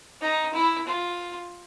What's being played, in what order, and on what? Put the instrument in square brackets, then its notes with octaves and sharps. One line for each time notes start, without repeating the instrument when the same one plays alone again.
[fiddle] D#4
E4
F4